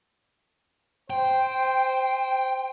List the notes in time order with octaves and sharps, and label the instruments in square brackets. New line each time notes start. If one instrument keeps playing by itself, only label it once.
[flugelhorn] C5 [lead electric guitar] G5